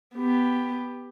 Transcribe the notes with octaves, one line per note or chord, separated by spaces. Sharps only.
B3 G4